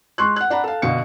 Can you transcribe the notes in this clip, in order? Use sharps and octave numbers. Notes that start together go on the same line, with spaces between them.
G#3 C6 C#6 F#6
F#5 F#6
D4 F#5 A#5 B5
A4 F5
B2 D3 F5 C#7